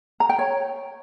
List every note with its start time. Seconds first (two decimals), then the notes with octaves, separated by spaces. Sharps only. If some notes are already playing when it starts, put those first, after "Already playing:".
0.20 A#5
0.29 G5
0.39 C#5